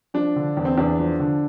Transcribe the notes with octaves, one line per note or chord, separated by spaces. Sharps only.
F3 D4
D3
E2
C4
E2 D4
F3
D3